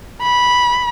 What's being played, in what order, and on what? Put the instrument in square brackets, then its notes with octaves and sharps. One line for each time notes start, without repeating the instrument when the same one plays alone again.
[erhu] B5